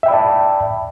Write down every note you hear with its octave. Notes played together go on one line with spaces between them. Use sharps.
D5 E5 G5 A5 B5